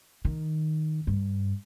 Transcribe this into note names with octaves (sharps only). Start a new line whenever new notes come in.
D#3
G2